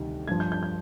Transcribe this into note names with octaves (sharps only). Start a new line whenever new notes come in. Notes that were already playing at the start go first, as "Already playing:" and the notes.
Already playing: D2 C3 D#3 G3
G2 F3 G#6
G6
G6
G6